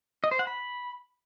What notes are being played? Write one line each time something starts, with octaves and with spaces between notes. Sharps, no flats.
D#5
C5
F#5
B5